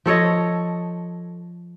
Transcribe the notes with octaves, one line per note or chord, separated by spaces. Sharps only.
F3 A4 C#5 D#5